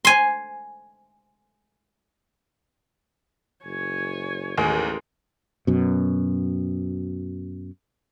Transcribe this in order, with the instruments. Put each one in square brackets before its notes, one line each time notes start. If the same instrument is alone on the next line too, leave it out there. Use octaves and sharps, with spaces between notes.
[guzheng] G#5 C6
[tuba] F#1 [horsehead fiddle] C#5 G#5
[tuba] A1 [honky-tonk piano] D#2 [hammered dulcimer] G#3
[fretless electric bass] F#2 B2